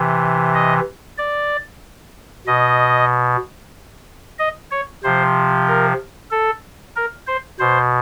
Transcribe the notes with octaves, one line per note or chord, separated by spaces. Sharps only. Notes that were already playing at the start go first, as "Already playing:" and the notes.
Already playing: C3 E3
D#5
D5
B2 D#5
D#5
C#5
C3 F3 C5
A#4
A4
A#4
C5
B2 C5